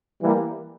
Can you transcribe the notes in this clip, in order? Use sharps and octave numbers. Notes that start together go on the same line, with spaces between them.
E3 G3 A#3